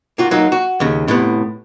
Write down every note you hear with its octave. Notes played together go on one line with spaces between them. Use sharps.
A#3 F4 F#4
F#3 A#3 D#4
F#4
D#2 C#3
A2 C3 B3